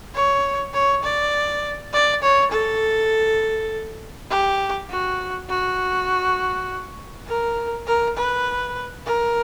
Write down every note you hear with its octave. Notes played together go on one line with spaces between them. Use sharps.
C#5
C#5
D5
D5
C#5
A4
G4
F#4
F#4
A#4
A#4
B4
A#4